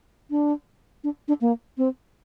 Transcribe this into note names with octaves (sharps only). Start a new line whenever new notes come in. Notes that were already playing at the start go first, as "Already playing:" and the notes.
D4
D4
D4
A#3
C4